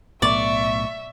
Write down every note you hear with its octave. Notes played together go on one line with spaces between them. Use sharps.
B1 A2 B3 D5 E5 C#6